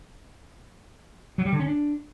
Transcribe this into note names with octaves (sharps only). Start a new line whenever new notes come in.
F#3
G3
D3
C#4
D4